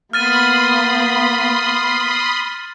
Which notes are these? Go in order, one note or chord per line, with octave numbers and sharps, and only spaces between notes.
A#3 B3 B5 C6 D#6 F6 A6 D#7